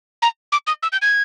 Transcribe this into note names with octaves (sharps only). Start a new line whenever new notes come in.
A#5
D6
D#6
E6
G6
G#6